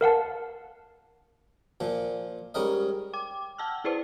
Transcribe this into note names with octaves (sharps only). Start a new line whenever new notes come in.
A#4 F5 F#5 A5
A#2 F3
G#2 G3 C#4 A#4 D#5
G5 D6
F#5 G5 A5 E6 F6
E4 G#4 B4 C5 D5 G5